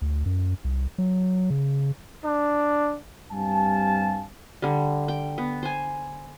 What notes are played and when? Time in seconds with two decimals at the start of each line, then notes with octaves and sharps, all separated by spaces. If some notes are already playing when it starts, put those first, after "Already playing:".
0.02 D2
0.26 F#2
0.65 C2
0.98 F#3
1.50 C#3
2.24 D4
3.31 G2 G3 C4 F5 G#5 A5
4.62 D3 G3
5.08 G5
5.38 B3
5.63 C5 G#5